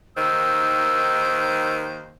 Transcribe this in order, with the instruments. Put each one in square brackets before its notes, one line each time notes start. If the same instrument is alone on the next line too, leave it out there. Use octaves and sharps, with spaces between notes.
[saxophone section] D#2 D#3 C5 [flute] E6